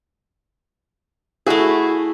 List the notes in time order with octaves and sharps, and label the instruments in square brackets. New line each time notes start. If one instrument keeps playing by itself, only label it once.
[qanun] A3 E4 [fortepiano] F#4 G#4